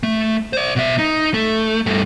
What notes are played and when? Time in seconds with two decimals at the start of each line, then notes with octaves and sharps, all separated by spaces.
0.03 A3
0.53 C5 D5
0.76 B2 E5
0.99 D#4
1.34 A3
1.86 G2 A3